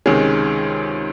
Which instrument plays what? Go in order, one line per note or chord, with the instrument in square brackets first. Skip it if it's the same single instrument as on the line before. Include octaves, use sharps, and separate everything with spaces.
[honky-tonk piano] C#2 C3 D#3 G#3 C#4